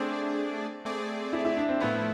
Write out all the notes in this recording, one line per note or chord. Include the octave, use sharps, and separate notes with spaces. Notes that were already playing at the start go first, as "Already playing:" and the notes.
Already playing: A3 C4 D4 G#4 D5
A3 C4 G#4 D5
E4
E4
D4
C4
A2 F3 A3 B3 E4